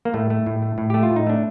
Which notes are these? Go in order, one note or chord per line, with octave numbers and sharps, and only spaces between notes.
A#3
A2 A3
A3
A2
A3
A2
A3 G4
F4
A2
D#4
A3 D4